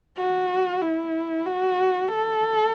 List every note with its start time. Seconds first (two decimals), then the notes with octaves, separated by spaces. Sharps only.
0.18 F#4
0.82 E4
1.46 F#4
2.09 A4